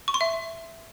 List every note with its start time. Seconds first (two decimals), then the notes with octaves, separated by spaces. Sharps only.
0.08 C#6
0.14 C6
0.21 E5